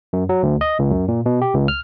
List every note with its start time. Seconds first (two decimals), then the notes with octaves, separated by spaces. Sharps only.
0.13 F#2
0.29 F#3
0.43 D2
0.61 D#5
0.79 C#2
0.91 F#2
1.08 A#2
1.26 B2
1.42 G4
1.54 C#2
1.68 F6